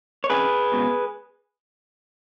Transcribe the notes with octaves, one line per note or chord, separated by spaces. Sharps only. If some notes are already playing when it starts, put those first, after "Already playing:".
C#5
F2 C#3 G#4 B4
C#2 B2